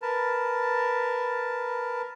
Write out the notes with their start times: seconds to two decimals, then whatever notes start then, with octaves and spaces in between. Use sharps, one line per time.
0.02 A#4 B4 A5